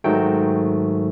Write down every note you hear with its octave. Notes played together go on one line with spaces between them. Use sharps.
G#2 D#3 F#3 A3 G5